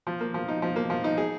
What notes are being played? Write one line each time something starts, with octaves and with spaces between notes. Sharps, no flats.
F3
A#3
F3
D#4
F3
A#3
F3
D#4
G#4